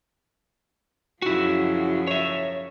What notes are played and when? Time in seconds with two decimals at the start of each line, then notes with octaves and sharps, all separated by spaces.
1.22 F#2 C#3 F3 E4 F#4
2.07 C#5 E5